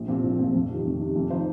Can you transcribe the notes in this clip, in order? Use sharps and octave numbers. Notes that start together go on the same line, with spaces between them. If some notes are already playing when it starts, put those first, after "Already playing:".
Already playing: A#1
A#2 F3 C4
A#1
A#2 F3 C4
F2
C3 D#3
F2
C3 D#3
F2
F3 D#4 C5